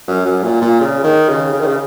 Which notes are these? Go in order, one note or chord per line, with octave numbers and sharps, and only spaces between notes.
F#2
F#2
A#2
A#2
C#3
D#3
C#3
C#3
D#3
C#3